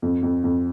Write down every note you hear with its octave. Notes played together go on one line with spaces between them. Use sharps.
F2
F2
F2